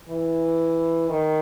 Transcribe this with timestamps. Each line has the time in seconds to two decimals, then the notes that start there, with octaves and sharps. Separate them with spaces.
0.09 E3
1.10 D#3